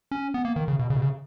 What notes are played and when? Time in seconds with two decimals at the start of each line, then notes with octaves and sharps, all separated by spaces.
0.11 C#4
0.34 B3
0.45 A#3
0.56 D#3
0.68 C#3
0.79 B2
0.90 C#3
0.96 B2
1.01 C#3